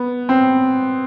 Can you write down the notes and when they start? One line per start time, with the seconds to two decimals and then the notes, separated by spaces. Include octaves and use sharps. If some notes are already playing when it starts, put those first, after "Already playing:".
Already playing: B3
0.29 C4